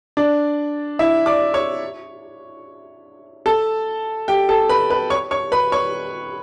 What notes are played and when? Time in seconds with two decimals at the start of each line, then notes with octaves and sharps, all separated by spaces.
0.17 D4 D5
0.99 E4 E5
1.26 D5 D6
1.54 C#5 C#6
3.46 A4 A5
4.28 G4 G5
4.49 A4 A5
4.69 B4 B5
4.90 B4 B5
5.10 C#5 C#6
5.31 C#5 C#6
5.52 B4 B5
5.72 C#5 C#6